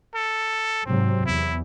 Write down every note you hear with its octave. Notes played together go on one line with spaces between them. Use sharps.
A4
G#2 C3 F#3 C4
E2 E4